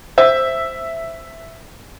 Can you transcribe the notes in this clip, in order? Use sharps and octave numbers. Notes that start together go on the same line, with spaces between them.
C5 E5